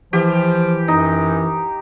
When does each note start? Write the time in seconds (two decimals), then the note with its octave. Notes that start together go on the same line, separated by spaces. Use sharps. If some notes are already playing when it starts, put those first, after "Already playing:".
0.13 E3 F3 G4
0.88 F#2 D#4